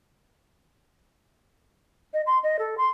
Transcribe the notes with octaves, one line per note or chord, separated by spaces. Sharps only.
D#5
C6
D#5
A4
C6